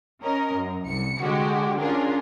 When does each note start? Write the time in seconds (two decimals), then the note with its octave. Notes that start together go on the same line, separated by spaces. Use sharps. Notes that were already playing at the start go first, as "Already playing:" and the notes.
0.23 C#4 A#4 D#5
0.55 F#2
0.86 C2 C#7
1.21 D3 G#3 F#4 G4
1.80 C#4 D4 F4 G#4 A#4